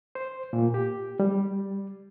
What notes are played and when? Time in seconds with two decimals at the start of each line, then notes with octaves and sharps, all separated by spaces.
0.15 C5
0.53 A#2
0.74 G4
1.20 G3